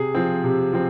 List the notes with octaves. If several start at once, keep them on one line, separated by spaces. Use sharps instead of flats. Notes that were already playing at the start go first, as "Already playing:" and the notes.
Already playing: C3 G#4
F3 C4
C3
F3 C4